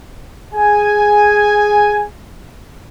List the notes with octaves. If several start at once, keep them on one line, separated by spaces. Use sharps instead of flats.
G#4 G#5